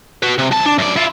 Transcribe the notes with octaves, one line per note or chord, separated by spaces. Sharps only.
F#4 B4
C3
C2 A5
D4
F#2 D5
E4 F4